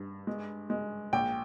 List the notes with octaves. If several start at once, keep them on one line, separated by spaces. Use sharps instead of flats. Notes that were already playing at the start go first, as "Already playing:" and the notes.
Already playing: G2
G#3
G#3
A#1 G5